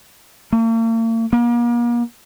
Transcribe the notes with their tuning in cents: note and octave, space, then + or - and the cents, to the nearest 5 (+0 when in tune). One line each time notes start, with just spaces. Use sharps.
A#3 -45
A#3 +40